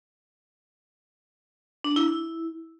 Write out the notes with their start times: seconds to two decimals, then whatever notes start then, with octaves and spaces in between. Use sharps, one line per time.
1.84 D4
1.96 E4
2.08 E4